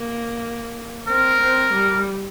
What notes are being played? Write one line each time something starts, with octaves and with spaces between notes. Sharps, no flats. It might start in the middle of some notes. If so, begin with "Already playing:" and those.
Already playing: A#3
C4 A#4
C4
G3